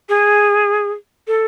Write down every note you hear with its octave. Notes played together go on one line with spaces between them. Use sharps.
G#4
A4